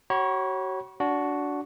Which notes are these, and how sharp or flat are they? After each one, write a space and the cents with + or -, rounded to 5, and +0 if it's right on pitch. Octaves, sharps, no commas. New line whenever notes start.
F#4 +35 C#5 -20 B5 -40
D4 -20 F#4 +0